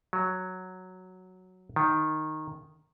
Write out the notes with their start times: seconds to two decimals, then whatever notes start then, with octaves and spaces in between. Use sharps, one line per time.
0.13 F#3
1.76 D#3